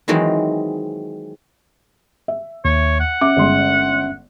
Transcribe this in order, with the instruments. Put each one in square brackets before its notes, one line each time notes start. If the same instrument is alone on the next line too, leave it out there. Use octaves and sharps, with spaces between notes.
[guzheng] D#3 E3 F#3 G#3 C4 D#4
[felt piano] E5
[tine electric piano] D#2 [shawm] C#5
[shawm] F#5
[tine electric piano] C#4 E5 [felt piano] D6
[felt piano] G1 G#3 C6